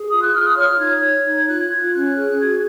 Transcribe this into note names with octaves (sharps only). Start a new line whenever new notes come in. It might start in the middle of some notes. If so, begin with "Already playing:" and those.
Already playing: G#4
F4 D#6
F#6
F4 F6
D#6
F#6
C#5 F6
D#4 G#6
C#5
D#4
F4 F#6
F4 G#6
C#4 F#6
G#4
F#4 G#6